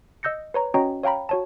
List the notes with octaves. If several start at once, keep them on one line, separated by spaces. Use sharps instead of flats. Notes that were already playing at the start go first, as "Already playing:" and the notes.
D#5 E6 G6 A#6 C#7
B4 C#5 A#5
C#4 F#4 C#5 D#5 G5 A#5
C#5 F5 G5 A#5 B5
F#4 C#5 A5